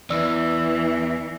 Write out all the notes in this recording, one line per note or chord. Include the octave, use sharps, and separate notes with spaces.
E2 E3 D5 E6